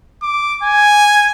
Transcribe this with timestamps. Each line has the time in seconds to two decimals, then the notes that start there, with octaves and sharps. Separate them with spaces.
0.22 D6
0.63 G#5